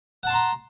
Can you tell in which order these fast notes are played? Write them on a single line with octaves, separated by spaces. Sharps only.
F#5 A5 C6 A#5